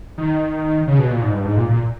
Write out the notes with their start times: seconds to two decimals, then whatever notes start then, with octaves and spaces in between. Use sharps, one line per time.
0.18 D#3
0.87 C#3
0.99 B2
1.11 A#2
1.22 G#2
1.33 G2
1.45 G#2
1.57 A#2
1.69 A#2